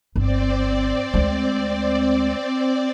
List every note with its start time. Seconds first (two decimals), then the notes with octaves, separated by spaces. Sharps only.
0.16 G1 C4 D5
1.14 D2 G#3